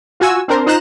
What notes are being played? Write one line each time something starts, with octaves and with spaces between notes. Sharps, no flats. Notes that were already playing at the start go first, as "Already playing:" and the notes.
F4 F#4 G#5 E6
C4 D4 A#4 C5
D#4 F4 C5 A#5 F#6 E7